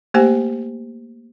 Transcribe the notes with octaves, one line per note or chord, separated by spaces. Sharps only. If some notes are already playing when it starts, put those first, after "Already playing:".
A3 A#3 G4 C5 G#5